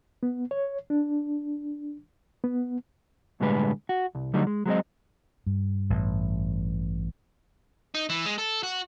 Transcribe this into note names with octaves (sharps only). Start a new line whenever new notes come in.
B3
C#5
D4
B3
B1 A2 D3 G3 G#3 B4
F#4
C2
D3 F#3 G3 A3 D#4
G#3
F#3 G#3 C4 D#5
G2
A1
D#4
E3
G#3
A4
F#4